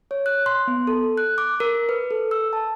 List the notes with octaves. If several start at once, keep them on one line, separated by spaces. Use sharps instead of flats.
C#5
F#6
C6
B3
A4
F#6
D6
A#4
B4
A4
E6
A5